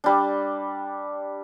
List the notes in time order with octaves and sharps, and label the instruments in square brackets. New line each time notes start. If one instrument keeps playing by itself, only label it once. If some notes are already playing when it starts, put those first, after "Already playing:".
[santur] G3 D4